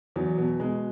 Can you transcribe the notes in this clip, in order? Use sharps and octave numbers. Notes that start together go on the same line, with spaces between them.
E2 F#3
B2
B2 G#3